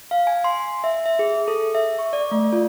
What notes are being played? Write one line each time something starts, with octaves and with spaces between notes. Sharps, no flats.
F5
G#5
C6
E5
E5
G#4
A4
E5
C#6
D5
A3
F4